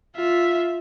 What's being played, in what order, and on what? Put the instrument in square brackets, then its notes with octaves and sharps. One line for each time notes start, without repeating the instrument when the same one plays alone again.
[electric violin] F4 E5